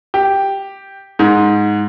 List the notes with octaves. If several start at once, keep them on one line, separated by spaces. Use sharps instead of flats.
G4
G#2